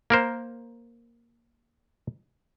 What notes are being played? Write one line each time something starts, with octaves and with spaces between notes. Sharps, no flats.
A#3 A#4 C5